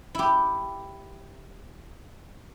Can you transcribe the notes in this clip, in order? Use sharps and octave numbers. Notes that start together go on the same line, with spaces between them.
E4 G4